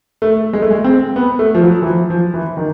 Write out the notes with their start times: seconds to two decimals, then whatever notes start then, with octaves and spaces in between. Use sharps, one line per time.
0.22 A3
0.53 G#3
0.62 A3
0.71 G#3
0.84 C4
1.16 B3
1.39 A3
1.55 F3
1.63 F#3
1.82 E3
1.86 F3
2.10 F3
2.34 E3
2.57 D#3